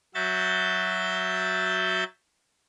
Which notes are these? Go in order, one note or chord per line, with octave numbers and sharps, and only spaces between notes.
F#3 F#4 E5 G6 A6